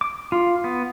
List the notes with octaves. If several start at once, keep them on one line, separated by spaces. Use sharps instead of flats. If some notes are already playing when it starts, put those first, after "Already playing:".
D6
F4
B3